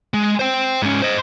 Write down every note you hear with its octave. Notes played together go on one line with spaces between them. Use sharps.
G#3
C5 G5
G#2 C#4
C5 D#5